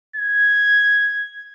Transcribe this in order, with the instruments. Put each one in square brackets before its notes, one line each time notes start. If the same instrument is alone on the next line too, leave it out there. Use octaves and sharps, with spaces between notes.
[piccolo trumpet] G#6